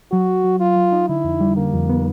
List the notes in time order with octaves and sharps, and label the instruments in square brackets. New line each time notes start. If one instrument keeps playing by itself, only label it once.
[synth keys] F#3 [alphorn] F#4
[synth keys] F#3
F#3
[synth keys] F#3 [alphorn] F4
[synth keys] F#3
D#4
[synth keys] D3 [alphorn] E4
[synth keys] F2
G3
[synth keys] D3 [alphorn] A#3
[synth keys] F2
B3